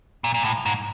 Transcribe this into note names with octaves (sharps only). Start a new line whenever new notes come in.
A#2
A#2
A2
G#2